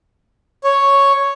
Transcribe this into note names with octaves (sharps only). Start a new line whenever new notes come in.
C#5